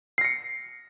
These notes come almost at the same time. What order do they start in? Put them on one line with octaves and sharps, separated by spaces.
C7 A#6 C#7